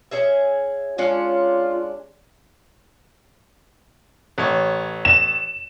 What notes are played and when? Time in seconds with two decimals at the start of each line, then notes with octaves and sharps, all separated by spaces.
0.11 C#4 G#4 E5
0.98 G#3 C#4 D4 F4
4.38 A1 C#5
5.05 E7